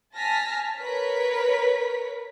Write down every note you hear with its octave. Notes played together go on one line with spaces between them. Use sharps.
G#5 A5 F6 A#6 B6
A#4 B4 C#5 B6